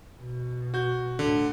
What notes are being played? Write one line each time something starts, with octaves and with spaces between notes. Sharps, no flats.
B2
F#4 G6
D2 A2 D3